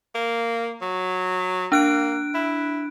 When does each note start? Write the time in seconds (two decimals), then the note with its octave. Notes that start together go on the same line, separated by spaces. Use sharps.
0.15 A#3
0.81 F#3
1.72 A#3 D4 F#6 D7
2.34 E4